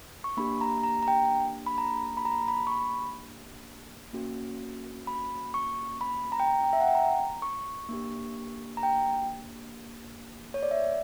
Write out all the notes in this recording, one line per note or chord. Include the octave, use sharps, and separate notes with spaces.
C#6
A#3 D4 G4 B5
A#5
A#5
A#5
G5
B5
A#5
B5
A#5
B5
C#6
B5
A#3 C#4 F#4
B5
C#6
B5
A#5
G5
A#5
G5
E5
F#5
G5
A#5
C#6
A#3 D4 G4
A#5
G5
C#5
D5
E5